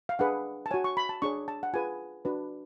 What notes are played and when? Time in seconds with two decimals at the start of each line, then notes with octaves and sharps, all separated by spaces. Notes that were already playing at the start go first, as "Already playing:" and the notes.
0.09 F5
0.19 D4 G#4 B4 F#5
0.66 A5
0.71 F#4 C#5 G#5
0.84 C#6
0.97 B5
1.09 A5
1.22 D4 G#4 C#5 C#6
1.48 A5
1.63 F#5
1.74 F4 G#4 B4 G#5
2.25 D4 F#4 B4